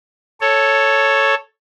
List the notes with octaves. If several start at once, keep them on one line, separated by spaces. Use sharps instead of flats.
A4 C#5